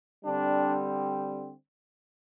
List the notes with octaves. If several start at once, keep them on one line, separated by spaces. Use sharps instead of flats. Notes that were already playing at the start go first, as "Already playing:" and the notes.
D3 G3 C4 D4